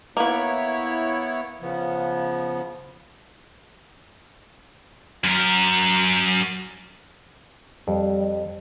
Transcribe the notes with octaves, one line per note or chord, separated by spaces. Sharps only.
A#3 B3 E4 B4 C#5
C#3 F3 B3
F#2 A#4
F2 G3